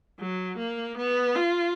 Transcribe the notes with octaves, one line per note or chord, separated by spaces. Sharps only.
F#3
A#3
B3
F4